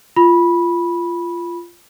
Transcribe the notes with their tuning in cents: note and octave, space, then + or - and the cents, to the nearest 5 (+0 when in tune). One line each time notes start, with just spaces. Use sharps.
F4 -15 B5 -15